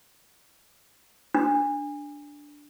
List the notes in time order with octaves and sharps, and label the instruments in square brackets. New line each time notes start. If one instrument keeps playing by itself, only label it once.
[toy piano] D4